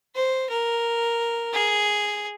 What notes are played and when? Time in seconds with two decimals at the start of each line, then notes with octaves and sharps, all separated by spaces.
0.15 C5
0.49 A#4
1.53 G#4